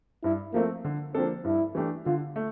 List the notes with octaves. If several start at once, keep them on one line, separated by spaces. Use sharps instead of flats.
G2 E4
F3 A3 A#3 C4
D3
F3 A#3 C4 D4 A4
G2 E4
E3 A3 D4 G4
D3 F4
A3